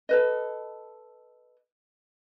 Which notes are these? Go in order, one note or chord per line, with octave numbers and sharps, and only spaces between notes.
A4 B4 D#5